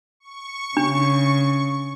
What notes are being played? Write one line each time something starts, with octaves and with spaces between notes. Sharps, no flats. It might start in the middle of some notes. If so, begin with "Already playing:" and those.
C#6
C#3 D4